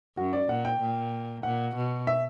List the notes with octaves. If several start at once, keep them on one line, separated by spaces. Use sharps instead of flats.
F#2 F#4
D5
A#2 F#5
G5
A#2
A#2 F#5
B2
E5